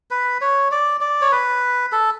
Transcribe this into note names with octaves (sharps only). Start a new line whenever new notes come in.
B4
C#5
D5
D5
C#5
B4
A4